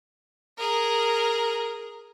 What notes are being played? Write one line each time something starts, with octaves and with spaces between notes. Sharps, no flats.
G#4 A#4